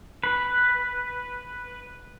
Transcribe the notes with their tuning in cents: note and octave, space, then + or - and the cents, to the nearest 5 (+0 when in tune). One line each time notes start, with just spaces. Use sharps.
B4 +0